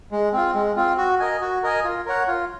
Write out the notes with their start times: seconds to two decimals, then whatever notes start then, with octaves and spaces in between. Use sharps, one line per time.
0.12 G#3
0.33 C4 F4
0.55 G#3
0.76 C4 F4
0.97 F#4
1.20 A#4 D#5 G#5
1.41 F#4
1.63 A#4 D#5 G#5
1.84 F4
2.06 A#4 C#5 F#5
2.28 F4